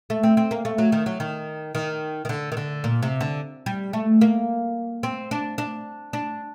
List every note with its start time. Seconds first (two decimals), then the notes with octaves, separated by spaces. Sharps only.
0.10 A3
0.23 C4
0.37 C4
0.51 A#3
0.65 A3
0.78 F#3
0.92 D#3
1.06 F#3
1.20 D#3
1.75 D#3
2.25 D#3
2.29 D3
2.52 D#3
2.57 D3
2.84 A#2
3.03 C3
3.21 D3
3.66 G3
3.93 A3
4.21 A#3
5.03 C4
5.31 D4
5.58 D4
6.13 D4